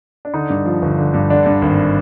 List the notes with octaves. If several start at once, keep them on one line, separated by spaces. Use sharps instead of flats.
D4
D3 D#4
G2
F3
G1
D3
G2
D3 D4
G2
G#1